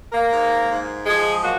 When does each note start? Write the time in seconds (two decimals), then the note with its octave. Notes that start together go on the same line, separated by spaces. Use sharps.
0.12 A#3 A#4
0.30 G#2
0.68 G#2
1.06 F3 G#3 G#4
1.43 F#3 A#3 F#4